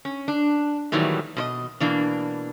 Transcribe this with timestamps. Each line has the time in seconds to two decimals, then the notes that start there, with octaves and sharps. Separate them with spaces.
0.05 C#4
0.28 D4
0.92 A#2 D#3 E3 F#3 G3 A3
1.37 B2 C5 D#5
1.80 B2 E3 A#3 D4